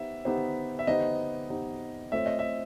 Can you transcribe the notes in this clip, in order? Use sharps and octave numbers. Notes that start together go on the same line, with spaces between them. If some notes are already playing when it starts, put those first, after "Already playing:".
Already playing: B3 D#4 G4 C5 E5
B3 D#4 G4 C5
E5
B3 D#4 G4 C5 D#5
B3 D#4 G4 C5
A3 C4 F4 A4 C#5 E5
D#5
E5